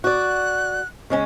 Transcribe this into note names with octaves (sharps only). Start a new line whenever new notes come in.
F#4 D5 F#6
C#3 G#3 C#4